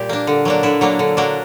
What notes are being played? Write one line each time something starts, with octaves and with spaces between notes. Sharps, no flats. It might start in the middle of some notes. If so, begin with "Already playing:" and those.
Already playing: A#2 G3 G4
A#3 D4
D3
F#3 A#3 D4
D3 E4
F#3 A#3 D4
D3
F#3 A#3 D4